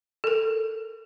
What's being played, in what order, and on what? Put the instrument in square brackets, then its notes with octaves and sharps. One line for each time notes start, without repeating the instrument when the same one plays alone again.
[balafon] A4 A#4